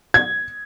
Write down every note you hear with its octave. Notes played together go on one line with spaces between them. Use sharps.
G#6